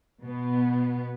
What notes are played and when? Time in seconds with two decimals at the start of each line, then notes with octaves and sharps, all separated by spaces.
0.24 B2 B3